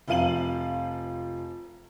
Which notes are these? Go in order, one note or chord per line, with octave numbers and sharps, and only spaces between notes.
F1 F3 F5 D#7 F#7